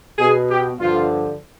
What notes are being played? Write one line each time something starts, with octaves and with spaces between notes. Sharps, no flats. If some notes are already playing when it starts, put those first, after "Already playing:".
B2 G#4
G4
G2 D3 F3 F4